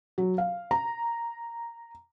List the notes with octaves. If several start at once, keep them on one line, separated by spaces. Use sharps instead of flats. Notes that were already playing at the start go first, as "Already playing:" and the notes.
F#3
F5
A#5